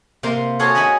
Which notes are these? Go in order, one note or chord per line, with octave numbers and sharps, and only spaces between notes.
C3 A#3 C5 F5 C6
F#4 G#4 A4 C#5 F5 F#5
D#5 E5 F#5 G#5 B5